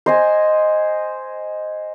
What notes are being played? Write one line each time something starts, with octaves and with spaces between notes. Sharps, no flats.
C5 D#5 G#5